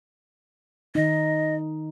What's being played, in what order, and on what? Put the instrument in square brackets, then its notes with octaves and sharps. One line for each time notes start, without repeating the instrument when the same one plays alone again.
[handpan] D#3 D#4 [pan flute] D#5